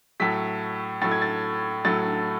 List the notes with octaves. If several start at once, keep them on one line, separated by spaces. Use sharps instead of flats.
A2 F#3 A3 B6
A2 F#3 A3 A6
G#6
A6
A2 F#3 A3 A6